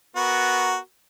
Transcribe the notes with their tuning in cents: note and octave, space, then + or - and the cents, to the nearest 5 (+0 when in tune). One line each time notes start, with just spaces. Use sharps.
B3 +0 F#4 +0 A#4 +0